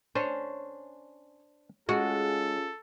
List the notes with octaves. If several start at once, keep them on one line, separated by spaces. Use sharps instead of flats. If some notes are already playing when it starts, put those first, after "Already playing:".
C#4 D4 C5
G#3 C#4 F4 F#4 G#4 A4